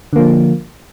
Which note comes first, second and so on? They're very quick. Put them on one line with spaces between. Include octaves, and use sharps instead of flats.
D3 A#3 F3